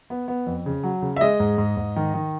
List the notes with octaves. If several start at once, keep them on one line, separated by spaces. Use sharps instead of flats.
B3
B3
F2
C#3
F#3
C#3
E5
G#3 D#5
G#2
G#2
G#2
D#3
D#3